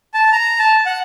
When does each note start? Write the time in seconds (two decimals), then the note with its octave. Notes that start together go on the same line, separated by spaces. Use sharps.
0.14 A5
0.32 A#5
0.59 A5
0.86 F#5